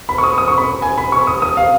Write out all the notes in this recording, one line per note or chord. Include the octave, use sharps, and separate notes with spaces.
B5
C#6
D#6
D#6
C#6
B5
G#5
B5
C#6
D#6
D#6
F5